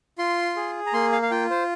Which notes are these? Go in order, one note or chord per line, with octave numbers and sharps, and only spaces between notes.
F4 C6
G#4
A#5
A#3 C6
F5
F5
F4 G5
C5